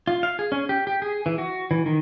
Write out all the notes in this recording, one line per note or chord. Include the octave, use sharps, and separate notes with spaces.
F4
F5
G#4
C#4
G4
G4
G#4
E3
F#4
E3
D#3